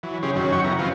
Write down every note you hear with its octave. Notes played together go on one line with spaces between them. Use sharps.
E3 F#3
C#3 C#4 G4 G#4 C6
F#2 D#3 F#3 C#4
C#5 F#5 G5 C#6
C#3 B3 E4 A#5
F3 F#3 B3 C4 F4